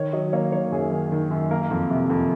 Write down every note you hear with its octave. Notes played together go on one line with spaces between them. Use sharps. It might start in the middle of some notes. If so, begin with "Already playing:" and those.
Already playing: D#3 C#5
F#3 D#5
A#3 C#5
D#3 C#5
F#2 G#4
D#3
D#3
F#2
A#3 A#4
F2
C3
F2